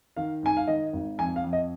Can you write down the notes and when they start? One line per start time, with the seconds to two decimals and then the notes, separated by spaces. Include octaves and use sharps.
0.17 D#3 F5
0.43 G#2 G#5
0.57 F5
0.68 D#3 D#5
0.93 G#1
1.18 F2 G#5
1.36 F5
1.44 F2
1.53 D#5